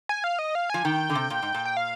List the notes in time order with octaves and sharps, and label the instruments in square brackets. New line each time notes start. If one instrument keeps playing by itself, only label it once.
[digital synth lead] G#5
F5
D#5
F5
[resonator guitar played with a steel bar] F3 [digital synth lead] G#5
[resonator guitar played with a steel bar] D#3 [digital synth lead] G5
[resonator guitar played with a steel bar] D3
C3
A#2
G#2
A#2
[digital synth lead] G5
F5